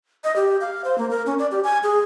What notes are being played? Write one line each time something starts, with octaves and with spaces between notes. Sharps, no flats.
D#5
G4
F5
C5
A#3
A#4
C#4
D5
G4
G#5
G#4